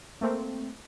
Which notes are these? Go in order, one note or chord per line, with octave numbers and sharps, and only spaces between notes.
A3 A#3 C4